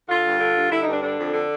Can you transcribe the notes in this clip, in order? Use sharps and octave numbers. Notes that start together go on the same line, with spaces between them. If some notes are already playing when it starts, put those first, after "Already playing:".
D3 F4
G2
D3
G2
D3 E4
D#4
G2 D4
D3 D4
F2
D3